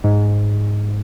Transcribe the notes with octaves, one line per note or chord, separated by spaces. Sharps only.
G#2